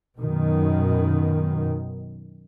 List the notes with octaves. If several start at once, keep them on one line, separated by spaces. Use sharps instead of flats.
F#2 B2 D#3